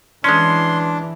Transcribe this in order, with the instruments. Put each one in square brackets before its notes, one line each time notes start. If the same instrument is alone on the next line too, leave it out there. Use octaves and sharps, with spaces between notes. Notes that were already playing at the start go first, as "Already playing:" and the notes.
[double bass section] E3 [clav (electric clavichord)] G#3 C#4 [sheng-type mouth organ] D4 [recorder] C6